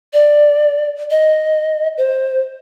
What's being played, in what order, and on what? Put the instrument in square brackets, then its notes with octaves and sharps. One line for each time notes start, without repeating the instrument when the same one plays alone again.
[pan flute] D5
D#5
C5